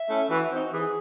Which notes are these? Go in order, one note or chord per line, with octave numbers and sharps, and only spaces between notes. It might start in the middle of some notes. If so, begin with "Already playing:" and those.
Already playing: E5
A3 C#4 E4
E3 F#4
C4 D#4
E3 G#4